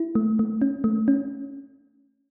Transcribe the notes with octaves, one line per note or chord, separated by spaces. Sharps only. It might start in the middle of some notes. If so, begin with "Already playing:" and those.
Already playing: E4
A3
A3
C#4
A3
C#4